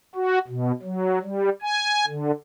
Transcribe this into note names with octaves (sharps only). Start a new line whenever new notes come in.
F#4
B2
F#3
G3
G#5
D3